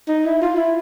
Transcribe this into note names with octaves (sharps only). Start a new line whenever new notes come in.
D#4
E4
F4
E4